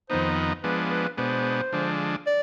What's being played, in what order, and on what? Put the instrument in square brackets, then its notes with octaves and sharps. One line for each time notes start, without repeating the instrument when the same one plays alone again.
[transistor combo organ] F2 D#3 B3 D#4 [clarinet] C5
[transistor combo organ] F3 G#3 B3 D4 [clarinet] B4
[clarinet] B4
[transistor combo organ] B2 G#3 B3 D4 [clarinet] C5
[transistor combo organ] D3 F3 G#3 D4
[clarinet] D5